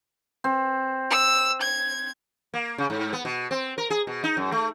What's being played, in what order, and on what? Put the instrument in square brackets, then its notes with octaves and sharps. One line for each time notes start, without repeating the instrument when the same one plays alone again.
[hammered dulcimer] C4
[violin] E6
G#6
[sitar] A#3
C#3
G#2
B3
B2
C4
A#4
G#4
B2
D#4
F#2
A3